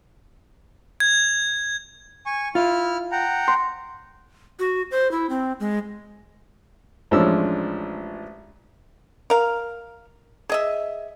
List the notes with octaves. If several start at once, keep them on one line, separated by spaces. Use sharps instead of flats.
G#6
G#5 C#6
E4 F4 F6
F#5 G5 A#5
C6
F#4
C5
E4
C4
G#3
A1 F3 G#3 C#4 D4 E6
A#4 F5
G#4 D#5 E5